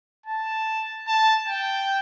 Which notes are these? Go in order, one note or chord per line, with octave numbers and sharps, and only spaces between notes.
A5
A5
G5